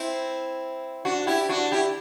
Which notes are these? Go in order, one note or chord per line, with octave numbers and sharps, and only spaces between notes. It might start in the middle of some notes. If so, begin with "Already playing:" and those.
Already playing: C4 E4
D4 F#4
E4 G4
D4 F#4
E4 G4